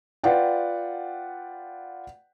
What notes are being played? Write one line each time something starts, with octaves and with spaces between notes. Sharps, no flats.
F4 B4 D5 F#5 G5